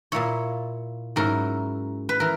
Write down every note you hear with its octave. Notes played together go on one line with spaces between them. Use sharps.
A#2 A#3 E4 C#5
G#2 F#3 C#4 E4 A#4
B4
E3 A#4